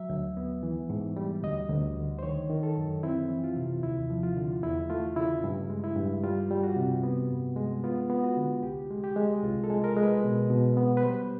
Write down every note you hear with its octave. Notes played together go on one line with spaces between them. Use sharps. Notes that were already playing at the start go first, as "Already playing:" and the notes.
Already playing: F#3 E5
D2
B3
E3
G#2
G3
D2 D#5
D2
D3
C5
D#3 C#5
D#3
A4
F#2
C4 E4
E3
F4
C3
D#2 E4
F3
F4
D3
E2 E4
A3 F4
C#3 E4
G2
G#3
E4
G2
G3 F4
G3
F#4
C3
B3
G2
G#3
B3 F4
B3
F#4
D3
C2 G4
G#3
G4
G#3
C2 F4
A4
G#3
A#4
G#3
B4
B2
B2
B3
B4
G3 C5